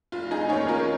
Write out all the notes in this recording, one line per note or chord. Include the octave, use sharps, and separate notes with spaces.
F1 F4
D#4 G#4
D#2 D#3 C#4 G#4 C#5
F4 A#4